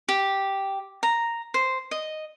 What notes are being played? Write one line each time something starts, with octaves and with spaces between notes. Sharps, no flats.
G4
A#5
C5
D#5